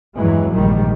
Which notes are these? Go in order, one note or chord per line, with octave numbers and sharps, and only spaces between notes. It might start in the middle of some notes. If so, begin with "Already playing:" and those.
E2 G2 E3 F#3 G#3
A#1 G#2 D#3 G3